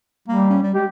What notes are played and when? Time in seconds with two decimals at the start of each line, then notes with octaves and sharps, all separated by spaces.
0.28 G3 A#3
0.50 C#4
0.63 G3
0.74 G#3 G4